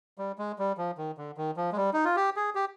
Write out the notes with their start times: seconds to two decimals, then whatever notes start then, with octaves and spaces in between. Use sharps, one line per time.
0.18 G3
0.38 G#3
0.59 G3
0.77 F3
0.98 D#3
1.18 D3
1.37 D#3
1.57 F3
1.72 G#3
1.77 G3
1.93 D#4
2.05 F4
2.16 G4
2.36 G#4
2.55 G4